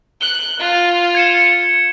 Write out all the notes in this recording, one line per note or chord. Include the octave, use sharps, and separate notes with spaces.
F#6 G7
F4
G#6 C#7 E7